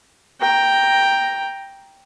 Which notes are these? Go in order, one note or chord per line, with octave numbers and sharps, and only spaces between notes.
G5 A#5